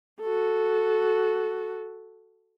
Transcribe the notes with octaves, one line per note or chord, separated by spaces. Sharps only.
F#4 A4